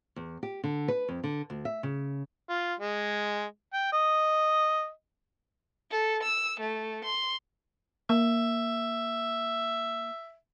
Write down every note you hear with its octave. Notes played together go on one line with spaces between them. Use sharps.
E2
G4
D3
B4
F2
D3
D2
E5
C#3
F4
G#3
G5
D#5
A4
E6
A3
C6
A#3 E5